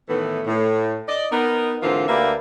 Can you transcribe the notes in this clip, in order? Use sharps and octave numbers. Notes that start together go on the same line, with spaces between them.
A2 D#3 E3 A3 B3
A2
D5 D#5
B3 D#4 A#4
G#2 D3 E3 A#3 C4 F4
D2 A#3 G4 B4 D5 E5